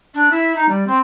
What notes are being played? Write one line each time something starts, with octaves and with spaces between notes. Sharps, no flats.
D4
E4
D#4
G3
C4